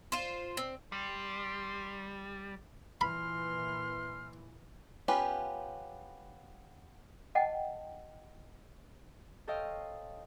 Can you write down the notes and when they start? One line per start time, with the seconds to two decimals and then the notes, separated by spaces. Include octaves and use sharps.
0.12 F4 C5
0.57 C4
0.92 G3 C6
3.01 A#2 E3 B5 C6 F6
5.08 B3 C#4 F4 G4 B4
7.35 D#5 F#5 G5 A5
9.48 A4 C5 C#5 D#5 F5 G5